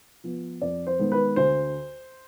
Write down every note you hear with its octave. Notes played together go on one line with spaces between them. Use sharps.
F3 B3
F2 D5
C5
D#3 G#3 B3
B4
D2 C5